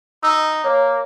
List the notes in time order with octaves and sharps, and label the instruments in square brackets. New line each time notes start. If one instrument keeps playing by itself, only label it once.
[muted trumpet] D#4 [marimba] E6
[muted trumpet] A#3 [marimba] C#5